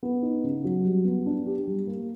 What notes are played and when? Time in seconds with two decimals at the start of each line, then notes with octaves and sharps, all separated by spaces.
0.03 B3
0.22 D#4
0.44 C#3
0.64 F#3
0.85 G3
1.05 B3
1.26 D4
1.46 G4
1.67 G3
1.87 A#3